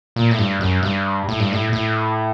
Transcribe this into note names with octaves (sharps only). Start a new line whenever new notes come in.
A#2
A2
G2
F#2
G2
A2
G2
A2
A2